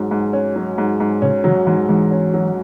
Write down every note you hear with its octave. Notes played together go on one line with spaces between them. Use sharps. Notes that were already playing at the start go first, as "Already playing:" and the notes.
Already playing: G#2 F#3
G#2
C#4
F#3
G#2
G#2
A2 C#3 C#4
C#3 E3 F#3
G#2 E3 G#3
G#2 E3 G#3
C#4
F#3